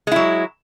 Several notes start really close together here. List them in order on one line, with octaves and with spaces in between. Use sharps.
G#3 E4 F#3